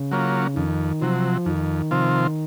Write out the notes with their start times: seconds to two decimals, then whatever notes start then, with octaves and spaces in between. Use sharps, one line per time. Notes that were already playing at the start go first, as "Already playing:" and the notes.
Already playing: C#3
0.11 F#3 A#3 C#4 F4
0.56 F2 D#3
1.02 C3 F3 F#3
1.46 F2 D#3
1.91 C3 F3 C4 F4